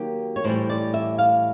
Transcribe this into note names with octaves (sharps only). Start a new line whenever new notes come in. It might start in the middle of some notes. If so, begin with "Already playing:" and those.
Already playing: D#3 F#3 A#3 G4
C#5
A2 E3 G3 C5
D5
E5
F5